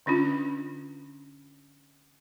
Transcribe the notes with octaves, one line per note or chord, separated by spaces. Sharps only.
D3 C#4 D4 F4